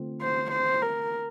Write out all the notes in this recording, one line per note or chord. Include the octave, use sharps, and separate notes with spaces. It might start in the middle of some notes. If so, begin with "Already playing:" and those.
Already playing: D3 A3 C4 F4
C5
C5
A#4